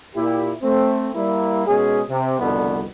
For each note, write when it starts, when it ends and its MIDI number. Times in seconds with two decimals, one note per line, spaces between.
0.16 0.52 46
0.16 0.52 64
0.16 0.52 67
0.62 1.10 57
0.62 1.10 60
1.15 1.66 55
1.15 1.66 58
1.15 1.66 64
1.67 2.01 47
1.67 2.01 56
1.67 2.01 61
1.67 2.01 68
2.09 2.38 48
2.40 2.85 36
2.40 2.85 41
2.40 2.85 47
2.40 2.85 50
2.40 2.85 55
2.40 2.85 59